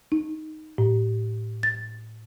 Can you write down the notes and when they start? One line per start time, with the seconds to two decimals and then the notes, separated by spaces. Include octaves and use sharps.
0.12 D#4
0.78 A2
1.63 A6